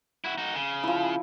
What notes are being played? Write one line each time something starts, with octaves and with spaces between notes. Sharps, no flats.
E4 F#4
D#4 F#4
C#3
F3 E4